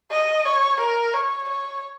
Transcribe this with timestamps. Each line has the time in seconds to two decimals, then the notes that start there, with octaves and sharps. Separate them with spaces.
0.11 D#5
0.45 C#5
0.80 A#4
1.14 C#5
1.48 C#5